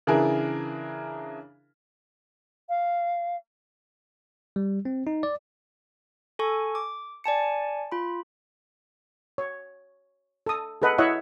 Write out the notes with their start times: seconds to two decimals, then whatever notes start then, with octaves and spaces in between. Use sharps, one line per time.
0.07 C#3 E3 D4 E4 G#4 A#4
2.69 F5
4.56 G3
4.85 C4
5.07 D#4
5.23 D5
6.39 A4 G#5 C#6
6.75 D6
7.24 D5 G#5 A5 C#7
7.92 F4 B5
9.38 C#5
10.46 A4 D#6
10.82 G#4 A4 B4 D#5 F#5
10.98 E4 C#5 D#5 E5 F#5